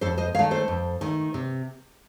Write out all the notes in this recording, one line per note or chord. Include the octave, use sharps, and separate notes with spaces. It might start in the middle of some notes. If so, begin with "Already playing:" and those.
F2 A4 C5
C5 D#5
D#3 A3 C#5 F5
A4 C5
F2
D#3 A3
C3